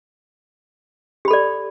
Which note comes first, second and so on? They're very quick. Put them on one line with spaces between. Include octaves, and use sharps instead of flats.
G4 B5 A4 D5